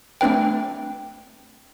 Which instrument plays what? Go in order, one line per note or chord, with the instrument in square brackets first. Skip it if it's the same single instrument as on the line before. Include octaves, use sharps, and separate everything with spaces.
[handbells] A3 C4 D4 B4 G5